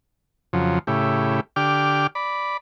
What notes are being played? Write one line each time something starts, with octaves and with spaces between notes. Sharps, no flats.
F2 C#3 F3 F#3
A2 C#3 E4 G4
D3 G4 G5 D6 F6
D5 B5